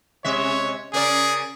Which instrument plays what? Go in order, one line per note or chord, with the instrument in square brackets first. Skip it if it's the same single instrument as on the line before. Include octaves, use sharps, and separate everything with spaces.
[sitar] C3 G#3 E5 [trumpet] C#5
[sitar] C#3 A#4 D5 [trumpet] G#4